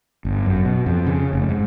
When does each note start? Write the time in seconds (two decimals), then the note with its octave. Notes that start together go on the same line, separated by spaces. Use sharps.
0.25 G1
0.46 F#2
0.65 B2
0.86 F2
1.07 C#3
1.33 F1
1.49 G#2